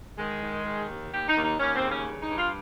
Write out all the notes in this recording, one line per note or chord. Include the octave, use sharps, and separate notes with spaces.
D#3 G#3
D#3
D#3
D#2
D#2 G4
D#4
D#2
D#4
D#2 C#4
C4
C#3
C#4
G2
D#4
G2
F4